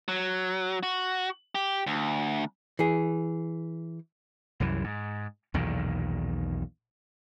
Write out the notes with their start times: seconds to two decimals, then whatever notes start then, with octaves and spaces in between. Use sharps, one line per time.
0.08 F#3
0.83 F#4
1.55 G4
1.87 D2
2.79 E3 G#4
4.60 C2 F#2 E3
4.84 G#2
5.54 B1 E2 A#2 D#3